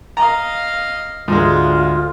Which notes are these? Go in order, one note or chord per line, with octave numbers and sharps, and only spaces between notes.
D#5 F5 A#5
D2 G#2 G#3 F4